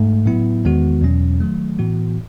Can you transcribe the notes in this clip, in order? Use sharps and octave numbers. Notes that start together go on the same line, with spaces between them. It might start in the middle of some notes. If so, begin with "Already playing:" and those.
Already playing: G#2 A3
A2 F#3 B3 E4
E2 D#3 G#3 B3 F#4
E2 B2 F#3 C#4
D#3 F#3 A3
A2 E3 B3 F#4